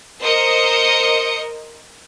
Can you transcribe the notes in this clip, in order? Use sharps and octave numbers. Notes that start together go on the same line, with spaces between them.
A#4 C5 D#5 D#6 C#7